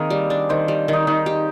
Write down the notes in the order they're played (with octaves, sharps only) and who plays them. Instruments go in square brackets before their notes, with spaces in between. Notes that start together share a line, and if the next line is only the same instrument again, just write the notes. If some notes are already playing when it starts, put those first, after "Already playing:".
Already playing: [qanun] D#3 [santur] A#3 C4 G#4 A#4
[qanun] G3
D4
[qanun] D#3 [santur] C5
[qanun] G3
[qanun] D#3 [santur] D#4
[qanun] D#3 [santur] D#4
[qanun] G4